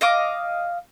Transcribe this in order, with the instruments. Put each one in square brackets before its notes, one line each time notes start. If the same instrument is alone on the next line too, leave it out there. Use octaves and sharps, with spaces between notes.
[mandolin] D#5 F5 D6